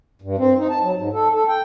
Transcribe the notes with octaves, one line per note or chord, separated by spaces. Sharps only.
G2
C4
D#4
A5
F#3
G#2
A4
A4
G5